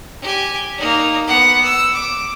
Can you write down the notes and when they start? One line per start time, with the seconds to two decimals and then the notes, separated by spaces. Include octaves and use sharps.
0.22 G4 G#5
0.77 A#3 D#4
1.27 B3 F#5
1.64 E6
1.94 D6